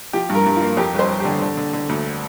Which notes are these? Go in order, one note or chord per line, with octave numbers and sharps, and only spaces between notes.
F3 G4
G2
A#4
G2
F4
A#3
F2 G4
G1 C5
G1
D3 G4
D3
D3
D3
D2